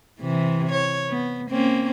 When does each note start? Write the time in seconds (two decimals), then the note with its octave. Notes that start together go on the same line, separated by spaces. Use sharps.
0.21 C3 E3
0.72 C#5
1.10 B3
1.51 A#3 C4 C#4